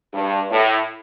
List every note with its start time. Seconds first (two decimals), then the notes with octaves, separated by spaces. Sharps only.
0.14 G2
0.51 A2